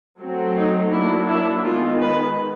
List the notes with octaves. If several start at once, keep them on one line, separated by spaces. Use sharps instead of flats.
F#3 A3 C4
D#4
F#3 A#3 D4 E4
E4
D#3 G#3 B3 F4
B4